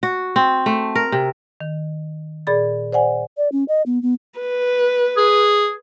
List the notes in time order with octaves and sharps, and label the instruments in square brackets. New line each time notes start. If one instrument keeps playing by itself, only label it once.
[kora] F#4
C4
A3
A#4
C3
[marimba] D#3
A#2 G#4 D5 B5 A6
C5 D5 F#5 G#5
[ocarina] D5
C#4
D#5
B3
B3
[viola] B4
[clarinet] G#4